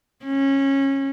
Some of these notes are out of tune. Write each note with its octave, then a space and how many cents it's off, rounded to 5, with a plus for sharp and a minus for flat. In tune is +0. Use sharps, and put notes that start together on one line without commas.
C#4 -20